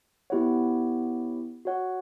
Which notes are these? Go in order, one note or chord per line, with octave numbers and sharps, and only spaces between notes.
B3 E4 G4 C#5 F#5
F#4 C#5 F#5